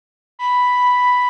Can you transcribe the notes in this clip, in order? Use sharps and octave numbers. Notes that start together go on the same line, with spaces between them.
B5